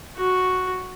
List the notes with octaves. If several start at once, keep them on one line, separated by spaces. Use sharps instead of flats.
F#4